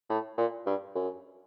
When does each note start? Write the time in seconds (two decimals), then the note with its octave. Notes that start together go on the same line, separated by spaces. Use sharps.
0.10 A2
0.38 A#2
0.66 G2
0.95 F#2